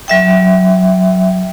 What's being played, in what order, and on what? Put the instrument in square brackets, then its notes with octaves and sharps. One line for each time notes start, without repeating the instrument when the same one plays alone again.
[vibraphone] F#3 E5 G5